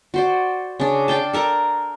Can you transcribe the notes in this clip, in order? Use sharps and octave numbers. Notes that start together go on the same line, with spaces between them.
F#4 C5 D5
C#3 D4
D5 F5 G5 A5
A4 A#4 A5 A#5